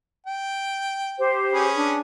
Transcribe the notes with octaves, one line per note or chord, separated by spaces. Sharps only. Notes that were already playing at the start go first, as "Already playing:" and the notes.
G5
G4 C5
C#4 G#4 B4
D4